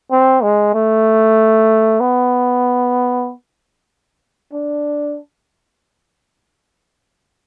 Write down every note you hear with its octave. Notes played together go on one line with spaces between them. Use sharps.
C4
G#3
A3
B3
D4